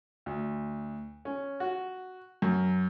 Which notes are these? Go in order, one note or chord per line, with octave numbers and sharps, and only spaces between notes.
D2
C#4
F#4
F#2